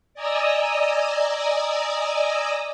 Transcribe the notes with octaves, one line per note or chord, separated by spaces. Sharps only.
D5 D#5 G#5 A#5 D#6 E6